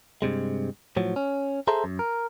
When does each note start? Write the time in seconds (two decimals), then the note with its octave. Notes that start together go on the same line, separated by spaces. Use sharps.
0.22 G2 C3 G#3
0.96 A2 F3 F#3
1.16 C#4
1.67 G#4 A4 C5 E5 A#5
1.84 F#2
1.99 A#4